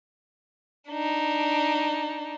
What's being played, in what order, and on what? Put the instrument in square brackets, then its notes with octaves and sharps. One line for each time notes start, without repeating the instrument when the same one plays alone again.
[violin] D4 D#4